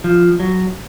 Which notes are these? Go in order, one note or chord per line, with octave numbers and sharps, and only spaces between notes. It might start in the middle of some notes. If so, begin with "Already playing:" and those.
F3
F#3